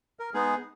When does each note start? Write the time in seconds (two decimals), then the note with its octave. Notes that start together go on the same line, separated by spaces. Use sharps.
0.19 A#4
0.34 G#3 B3 D#4 G#4